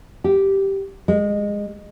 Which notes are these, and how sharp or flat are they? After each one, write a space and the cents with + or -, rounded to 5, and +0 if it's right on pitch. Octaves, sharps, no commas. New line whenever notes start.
G4 -5
G#3 -20